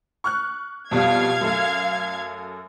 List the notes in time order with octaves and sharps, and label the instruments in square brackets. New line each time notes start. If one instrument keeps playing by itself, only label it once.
[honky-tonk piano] C#6 F6 F#6
[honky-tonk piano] F2 B2 G3 [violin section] F5 G#6
[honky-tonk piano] F#2 A3